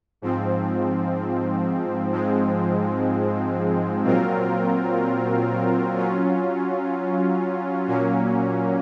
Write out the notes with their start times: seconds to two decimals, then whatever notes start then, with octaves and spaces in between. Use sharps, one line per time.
0.22 G#2 F3 C4
2.12 G#2 F3 G#3 C4
4.04 A#2 F#3 C4 F4 A#4
5.96 F#3 C#4 F4
7.87 A#2 F#3 A#3 C#4